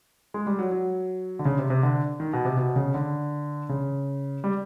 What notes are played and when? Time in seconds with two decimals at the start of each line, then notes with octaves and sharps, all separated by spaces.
0.34 G#3
0.47 G3
0.59 F#3
0.71 F#3
1.39 D3
1.45 C#3
1.59 C3
1.70 C3
1.83 D3
2.20 D#3
2.33 B2
2.45 C3
2.57 B2
2.76 C#3
2.94 D3
3.69 C#3
4.44 G3